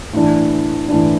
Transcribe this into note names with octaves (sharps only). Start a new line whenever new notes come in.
A2 E3 D4
A2 E3 D4